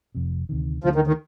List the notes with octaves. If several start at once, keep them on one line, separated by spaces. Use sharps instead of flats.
F1 F2 C3
D2 C3 D#3
D2 D3 F3 G#3 D4
D#3
D#3